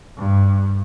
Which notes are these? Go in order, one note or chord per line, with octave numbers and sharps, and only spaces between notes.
G2